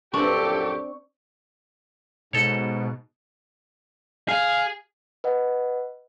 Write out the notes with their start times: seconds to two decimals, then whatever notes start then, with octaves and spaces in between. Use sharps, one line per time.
0.14 A#1 F#2 C4 D4 G4 A4 C#6
2.33 G#2 B2 D#4 A4 C#5
4.28 G#4 F5
5.24 B4 D#5 F#5